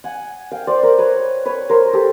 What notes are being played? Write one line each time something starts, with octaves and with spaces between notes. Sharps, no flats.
F#5 G#5
F5 G5
C5 D5
A#4 C5
B4 C#5
B4 C#5
A#4 C5
G4 A4